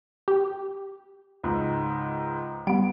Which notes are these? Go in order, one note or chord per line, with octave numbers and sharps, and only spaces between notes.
G4
C#2 G#2
G3 B3 D7